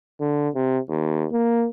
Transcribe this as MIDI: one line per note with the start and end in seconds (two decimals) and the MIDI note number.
0.20 0.49 50
0.55 0.79 48
0.89 1.27 39
1.32 1.68 58